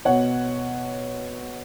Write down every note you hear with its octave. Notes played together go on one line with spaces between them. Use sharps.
B2 B3 C#5 F#5